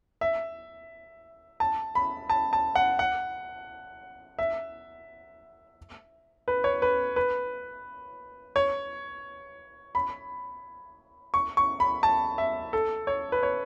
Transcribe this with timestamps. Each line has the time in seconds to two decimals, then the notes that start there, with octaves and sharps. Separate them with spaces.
0.21 E5
1.60 A5
1.95 B5
2.30 A5
2.53 A5
2.76 F#5
2.99 F#5
4.39 E5
6.48 B4
6.64 C#5
6.82 B4
7.16 B4
8.56 C#5
9.95 B5
11.34 C#6
11.57 C#6
11.80 B5
12.03 A5
12.38 E5
12.73 A4
13.07 C#5
13.32 B4
13.43 C#5